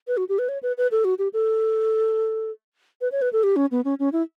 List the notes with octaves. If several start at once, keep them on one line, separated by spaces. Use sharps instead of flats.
B4
F#4
G4
B4
C#5
B4
B4
A4
F#4
G4
A4
B4
C#5
B4
A4
G4
C#4
B3
C#4
C#4
E4